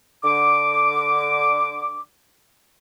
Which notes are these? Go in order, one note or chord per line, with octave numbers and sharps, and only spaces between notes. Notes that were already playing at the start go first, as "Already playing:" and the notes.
D3 D6